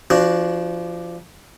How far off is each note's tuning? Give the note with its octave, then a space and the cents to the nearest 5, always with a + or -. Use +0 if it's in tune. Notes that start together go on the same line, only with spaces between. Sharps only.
F3 -25 D4 +0 F#4 +0